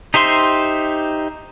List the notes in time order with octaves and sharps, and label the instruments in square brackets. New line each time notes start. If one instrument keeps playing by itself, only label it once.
[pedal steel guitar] D#4 G4 C5 E5 C6